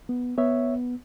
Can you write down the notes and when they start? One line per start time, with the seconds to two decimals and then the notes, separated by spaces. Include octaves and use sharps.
0.09 B3
0.38 B3 C#5 E5